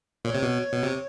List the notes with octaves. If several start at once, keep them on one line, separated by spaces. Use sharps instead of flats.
A#2 C#5
C3
B2
B2
C3